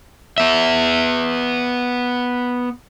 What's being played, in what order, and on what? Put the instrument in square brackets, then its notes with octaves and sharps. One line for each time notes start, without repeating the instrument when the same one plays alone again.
[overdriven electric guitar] B3 E5